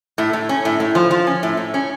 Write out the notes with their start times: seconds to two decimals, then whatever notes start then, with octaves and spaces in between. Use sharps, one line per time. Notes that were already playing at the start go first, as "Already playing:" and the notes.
0.18 A2
0.33 A2
0.49 C#4
0.65 A2
0.80 A2
0.95 F3
1.11 F3
1.27 C#4
1.43 A2
1.57 A2
1.74 C#4